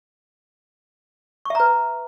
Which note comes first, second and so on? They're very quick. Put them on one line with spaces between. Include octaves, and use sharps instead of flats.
C#6 E5 A#5 B4